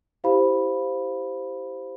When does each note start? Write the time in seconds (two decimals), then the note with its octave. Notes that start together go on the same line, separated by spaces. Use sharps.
0.24 E4 G4 C5 F5 B5